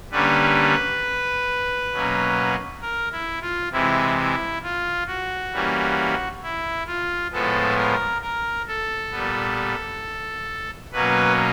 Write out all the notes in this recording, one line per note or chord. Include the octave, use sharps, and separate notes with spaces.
D3 G3 A#3 C#4 B4
B2 F#3 A#3 C#4
A#4
E4
F4
C3 E3 G#3 E4
E4
F4
F#4
E3 G3 A#3 C#4
E4
F4
A2 F3 G#3 B3 A4
A#4
A#4
A4
A#2 G3 B3
B2 F#3 A#3 C#4 B4